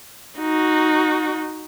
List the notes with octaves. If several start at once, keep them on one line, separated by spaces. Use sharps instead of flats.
D#4 F#4